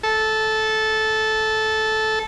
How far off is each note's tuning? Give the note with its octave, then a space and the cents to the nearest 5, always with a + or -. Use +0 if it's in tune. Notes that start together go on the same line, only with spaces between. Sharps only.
A4 -10